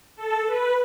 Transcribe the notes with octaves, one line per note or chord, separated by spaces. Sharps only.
A4
B4